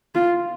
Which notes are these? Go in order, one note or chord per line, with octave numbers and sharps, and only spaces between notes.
F4